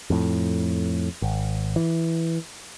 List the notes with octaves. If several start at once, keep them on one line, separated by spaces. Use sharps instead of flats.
F2 A2
G#1
E3